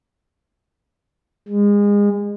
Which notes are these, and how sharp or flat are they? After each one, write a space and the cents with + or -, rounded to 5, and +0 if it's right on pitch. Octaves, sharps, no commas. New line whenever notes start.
G#3 -30